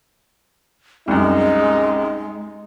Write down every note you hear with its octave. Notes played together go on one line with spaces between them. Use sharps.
C2 F#2 G#3 D#4